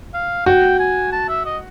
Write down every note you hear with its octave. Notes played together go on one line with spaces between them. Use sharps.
F5
F#4 G5
G#5
A5
E5
D#5